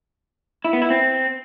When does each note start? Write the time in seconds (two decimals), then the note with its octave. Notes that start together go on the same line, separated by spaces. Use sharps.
0.65 E4
0.73 B3
0.82 E4
0.90 C4